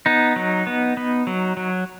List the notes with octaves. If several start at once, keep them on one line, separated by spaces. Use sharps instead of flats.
B3 D#4
F#3
B3
B3
F#3
F#3